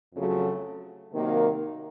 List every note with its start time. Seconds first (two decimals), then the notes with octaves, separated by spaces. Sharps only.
0.14 F2 C#3 F#3 A3
1.13 C3 D#3 F#3 A#3